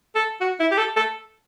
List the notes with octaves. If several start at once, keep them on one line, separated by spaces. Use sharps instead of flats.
A4
F#4
E4
G4
A4
A4